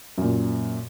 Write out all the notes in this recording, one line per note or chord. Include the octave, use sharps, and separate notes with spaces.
F#2 A#2